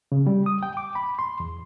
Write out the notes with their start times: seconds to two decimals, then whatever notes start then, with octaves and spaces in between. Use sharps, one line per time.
0.12 C#3
0.27 G3
0.46 D#6
0.63 G5
0.77 D6
0.95 B5
1.19 C6
1.40 E2